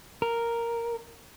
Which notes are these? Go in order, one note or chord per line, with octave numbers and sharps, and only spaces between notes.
A#4